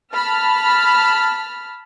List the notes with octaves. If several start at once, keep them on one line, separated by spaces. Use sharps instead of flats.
A5 B5 F6